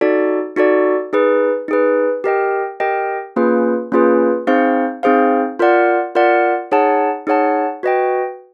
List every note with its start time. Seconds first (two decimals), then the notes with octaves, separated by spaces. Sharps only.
0.01 D#4 F#4 A4 D5
0.56 D#4 F#4 A4 D5
1.13 D#4 G#4 B4
1.68 D#4 G#4 B4
2.24 G4 A#4 D#5 G5
2.80 G4 A#4 D#5 G5
3.36 A#3 C#4 F4 G#4 B4
3.92 A#3 C#4 F4 G#4 B4
4.47 C4 D#4 G#4 C5 F5
5.03 C4 D#4 G#4 C5 F5
5.59 F4 A#4 D5 F#5
6.15 F4 A#4 D5 F#5
6.72 D#4 G#4 C#5 F#5 A5
7.27 D#4 G#4 C#5 F#5 A5
7.83 F#4 B4 D#5 G5